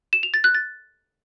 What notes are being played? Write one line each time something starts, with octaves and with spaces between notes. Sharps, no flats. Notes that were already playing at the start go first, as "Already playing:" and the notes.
E7
F7
A6
F#6
A6